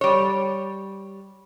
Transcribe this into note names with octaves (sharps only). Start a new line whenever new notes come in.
G3 C#5